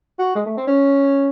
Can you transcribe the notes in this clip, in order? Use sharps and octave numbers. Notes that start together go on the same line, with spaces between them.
F#4
G#3
A3
C4
C#4